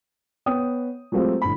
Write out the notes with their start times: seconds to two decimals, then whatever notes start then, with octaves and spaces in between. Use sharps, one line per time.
0.46 B3 C#5 G5 D#6
1.12 F#3 G#3 A3 C4 F4 G4
1.42 G1 A2 B5